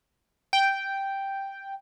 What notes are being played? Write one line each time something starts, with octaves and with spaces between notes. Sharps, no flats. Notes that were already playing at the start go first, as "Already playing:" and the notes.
G5